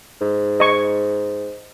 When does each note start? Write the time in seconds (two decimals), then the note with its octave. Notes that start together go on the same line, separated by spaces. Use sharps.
0.21 G#2
0.60 D#5 C#6